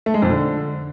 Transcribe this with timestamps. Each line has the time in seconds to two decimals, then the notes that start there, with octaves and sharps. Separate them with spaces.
0.06 A3
0.14 G#3
0.22 F2
0.30 D3